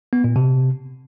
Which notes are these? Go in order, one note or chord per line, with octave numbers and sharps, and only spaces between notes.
B3
A#2
C3